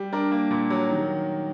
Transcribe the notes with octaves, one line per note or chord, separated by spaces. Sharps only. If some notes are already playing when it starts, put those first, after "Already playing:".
Already playing: G3
D4 A#4
A#3
A#2
F#3
D#3